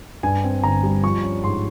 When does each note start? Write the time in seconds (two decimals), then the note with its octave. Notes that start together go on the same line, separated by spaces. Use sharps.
0.23 G2 G#5
0.44 C4
0.63 G1 A#5
0.83 G3
1.04 F3 C#6
1.23 C#4
1.44 G#2 C6